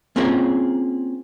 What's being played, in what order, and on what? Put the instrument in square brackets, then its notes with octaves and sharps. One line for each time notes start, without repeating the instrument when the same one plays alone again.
[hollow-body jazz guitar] A#3 C4 C#4 F4 G#4 A#4